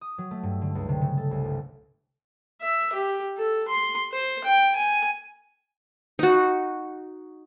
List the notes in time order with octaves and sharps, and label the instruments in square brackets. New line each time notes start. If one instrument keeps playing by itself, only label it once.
[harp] D#6
F#3
A3
G2
D3
C#2
C3
C#3
A4
C2
G1
[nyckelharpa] E5
G4
A4
C6
C5
G5
G#5
[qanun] D#4 F#4